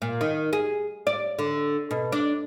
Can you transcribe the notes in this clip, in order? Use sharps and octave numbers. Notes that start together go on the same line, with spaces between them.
A#2
D#3
G#4
D5
D3
B2
D4